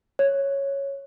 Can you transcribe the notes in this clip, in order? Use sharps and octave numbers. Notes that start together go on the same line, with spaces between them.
C#5